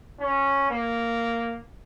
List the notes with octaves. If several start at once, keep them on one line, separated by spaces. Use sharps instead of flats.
C#4
A#3